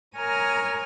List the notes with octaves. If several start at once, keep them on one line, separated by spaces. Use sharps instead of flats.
A#4 C#5 G#5 A#5 D#6 F6